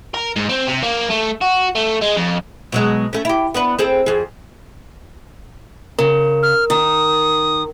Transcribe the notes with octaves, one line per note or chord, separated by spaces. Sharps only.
A#4
G#2
C4
C3
A#3
A3
F#4
A3
G#3
F2
B2 F#3 G#3
A3 C#4
E4 G4
B3 D4 B4
C4 G#4 A4
F2 G#4
C#3 A#4
F6
D#3 D#6